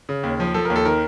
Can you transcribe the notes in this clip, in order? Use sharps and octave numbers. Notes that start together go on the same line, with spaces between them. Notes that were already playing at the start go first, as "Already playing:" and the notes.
C#3
D#2
F3
F3 A4
A#4
D#2
A4
D#3 A#4